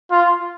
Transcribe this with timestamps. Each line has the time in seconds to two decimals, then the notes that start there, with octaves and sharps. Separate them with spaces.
0.11 F4